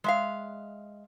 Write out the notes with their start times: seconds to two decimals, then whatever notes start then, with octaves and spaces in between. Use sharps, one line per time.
0.04 G#3 E5 F5